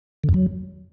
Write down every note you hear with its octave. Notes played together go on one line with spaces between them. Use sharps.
D3
F2
F#3